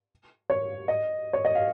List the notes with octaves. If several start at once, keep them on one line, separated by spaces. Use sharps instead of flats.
C#5
D#5
C#5
D#5
F5